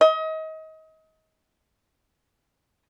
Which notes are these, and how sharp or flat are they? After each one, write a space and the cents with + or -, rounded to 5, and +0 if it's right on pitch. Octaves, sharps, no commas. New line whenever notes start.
D#5 +30